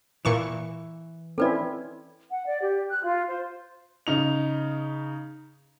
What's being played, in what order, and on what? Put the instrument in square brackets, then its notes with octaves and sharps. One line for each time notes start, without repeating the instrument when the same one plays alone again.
[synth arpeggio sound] A#2 C#6 E7 [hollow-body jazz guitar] E3
[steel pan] C4 C#4 E4 [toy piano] A4 B4 D5
[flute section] F#5
D5
G4
F#6
F4
C5
[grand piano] C#3 D#4 F7